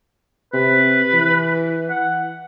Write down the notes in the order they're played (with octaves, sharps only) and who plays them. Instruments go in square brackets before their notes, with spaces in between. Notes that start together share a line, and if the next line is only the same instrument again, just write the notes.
[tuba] C3 [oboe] B4
[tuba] E3
[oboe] F#5